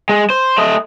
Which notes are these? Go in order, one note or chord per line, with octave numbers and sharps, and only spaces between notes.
G#3
C5
A3 D#5